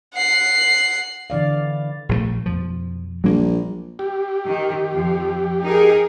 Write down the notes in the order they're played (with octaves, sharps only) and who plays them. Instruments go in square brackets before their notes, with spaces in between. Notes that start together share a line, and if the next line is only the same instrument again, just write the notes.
[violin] F#5 C7
[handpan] D3 E3 D5 F5
[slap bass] A#1 F3 A3
[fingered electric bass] B1 F2 [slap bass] F3
[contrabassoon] A#1 [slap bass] F#3 A#3 [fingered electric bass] G3
[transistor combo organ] G4
[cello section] D#3
F2 F3
D#4 G#4 A#4